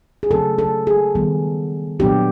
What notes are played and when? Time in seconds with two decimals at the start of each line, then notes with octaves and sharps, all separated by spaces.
0.23 G#4
0.31 C#3 F#3 A3 C4 A4
0.59 A4
0.87 G#4
1.15 D#3 G3 B3
2.00 A#2 F#3 B3 D4 G4